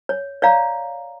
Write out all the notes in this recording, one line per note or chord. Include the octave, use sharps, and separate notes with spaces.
C#5
C#5 D5 F5 A#5